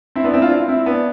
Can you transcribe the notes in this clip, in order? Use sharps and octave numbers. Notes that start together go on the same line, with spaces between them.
C4 E4
B3 D4
C4 E4
D4 F4
C4 E4
C4 E4
B3 D4